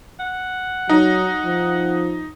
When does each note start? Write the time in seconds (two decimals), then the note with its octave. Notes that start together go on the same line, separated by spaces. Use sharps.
0.20 F#5
0.89 F#3 D#4
1.45 F3